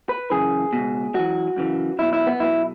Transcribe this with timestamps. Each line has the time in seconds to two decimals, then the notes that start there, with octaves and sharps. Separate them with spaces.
0.09 B4
0.30 F#2 C#3 E3 G#4
0.73 C#2 B2
1.15 F#2 E3 F#4
1.56 F#2 C#3 E3
1.99 B1 B2 E4
2.13 E4
2.27 B3
2.40 B1 B2 E4